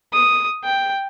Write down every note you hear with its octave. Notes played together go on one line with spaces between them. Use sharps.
D#6
G5